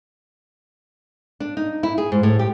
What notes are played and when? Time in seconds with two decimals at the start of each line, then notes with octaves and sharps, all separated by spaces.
1.40 D4
1.57 D#4
1.83 E4
1.98 G#4
2.12 G#2
2.23 A2
2.39 G4